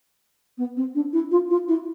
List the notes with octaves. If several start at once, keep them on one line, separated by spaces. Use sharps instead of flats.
B3
C4
D4
E4
F4
F4
E4